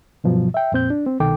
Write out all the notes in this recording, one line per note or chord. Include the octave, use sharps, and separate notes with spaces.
G2 B2 F3 F#3
E5 G5
F2 A#2 C4 G6
D4
C4
C2 B2 D#3 A4 G5 D6